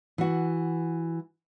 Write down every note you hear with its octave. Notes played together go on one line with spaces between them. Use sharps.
E3 F#4